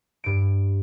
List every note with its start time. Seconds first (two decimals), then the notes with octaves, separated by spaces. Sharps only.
0.24 G2 D7